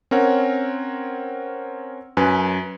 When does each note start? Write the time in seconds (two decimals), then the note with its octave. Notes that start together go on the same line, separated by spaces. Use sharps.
0.11 C4 C#4 A#4 C#5 F#5
2.17 F#2 B4 G#5